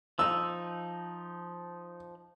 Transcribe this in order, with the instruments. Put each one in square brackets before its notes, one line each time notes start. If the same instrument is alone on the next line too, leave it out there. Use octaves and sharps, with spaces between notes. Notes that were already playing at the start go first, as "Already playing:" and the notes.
[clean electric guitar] F3 D#4 [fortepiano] E6